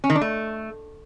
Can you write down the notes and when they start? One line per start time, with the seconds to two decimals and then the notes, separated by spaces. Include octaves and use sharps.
0.04 C#4
0.10 D#3
0.16 D4
0.21 A3